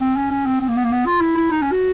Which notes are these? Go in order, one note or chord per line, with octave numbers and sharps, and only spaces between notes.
C4
C#4
C#4
C4
C4
A#3
B3
A#3
B3
F4
E4
E4
D#4
C#4
F#4